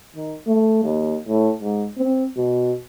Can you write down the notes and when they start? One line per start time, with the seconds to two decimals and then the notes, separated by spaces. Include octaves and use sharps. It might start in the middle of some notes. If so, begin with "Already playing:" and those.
0.16 D#3
0.47 A3
0.84 D#2
1.28 A2
1.62 G#2
1.98 C4
2.37 B2